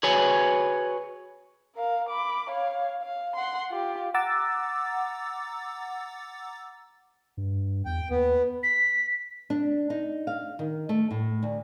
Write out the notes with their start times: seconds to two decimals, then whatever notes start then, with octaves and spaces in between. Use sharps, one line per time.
0.03 F#4 G#4 B4 C#5 G#5
1.76 A#4 F5
2.10 B5 D6
2.51 C#5 F5
3.02 F5
3.36 F#5 C6
3.71 F4 G4
4.14 F#5 A#5 D6 E6 A6
7.37 G2
7.86 E2 G5
8.10 D#2 B3
8.63 B6
9.50 D4
9.90 D#4
10.27 F5
10.59 D#3
10.89 A3
11.11 A2
11.43 D2